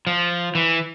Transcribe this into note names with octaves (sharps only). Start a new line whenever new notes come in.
F3
E3